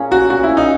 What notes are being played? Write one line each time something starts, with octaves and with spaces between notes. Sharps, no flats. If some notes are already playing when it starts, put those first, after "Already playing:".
Already playing: A#2 C#4 G#4
F#3 F#4
A#2 F#4
E4
C#4
D#4